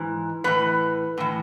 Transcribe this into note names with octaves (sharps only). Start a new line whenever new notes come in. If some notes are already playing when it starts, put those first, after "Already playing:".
Already playing: G#2 E3
A2 E3 B4
A2 E3